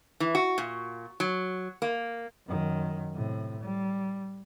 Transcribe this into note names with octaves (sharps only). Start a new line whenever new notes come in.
E3
F#4
A#2
F#3
A#3
F#2 D#3
A2 C3
G3